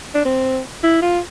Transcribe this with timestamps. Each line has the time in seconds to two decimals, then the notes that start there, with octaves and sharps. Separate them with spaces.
0.15 D4
0.25 C4
0.83 E4
1.02 F4